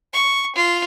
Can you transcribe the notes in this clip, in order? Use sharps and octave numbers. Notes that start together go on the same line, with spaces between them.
C#6
F4